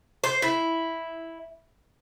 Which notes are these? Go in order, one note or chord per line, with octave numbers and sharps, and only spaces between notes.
C5
E4